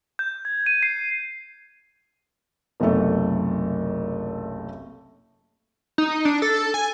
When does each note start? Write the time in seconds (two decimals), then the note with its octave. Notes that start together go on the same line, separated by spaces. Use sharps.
0.19 G6
0.45 G#6
0.66 D#7
0.83 C7
2.80 F#1 B1 C3 A3 A4
5.98 D#4
6.25 D4
6.42 A4
6.74 G#5